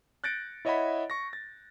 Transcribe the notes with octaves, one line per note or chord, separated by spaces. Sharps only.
F#6 G6 A6 A#6 C#7 D7
E4 C#5 D#5 E5 F#5 B5
C#6 A#6
A6